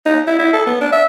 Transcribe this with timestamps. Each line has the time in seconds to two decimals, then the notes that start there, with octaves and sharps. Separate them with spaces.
0.06 D#4
0.27 E4
0.39 E4
0.53 A4
0.67 B3
0.81 D4
0.92 E5